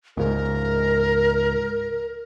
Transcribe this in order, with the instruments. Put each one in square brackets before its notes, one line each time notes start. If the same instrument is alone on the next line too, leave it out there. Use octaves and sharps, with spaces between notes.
[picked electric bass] C#2 G#2 [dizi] A#4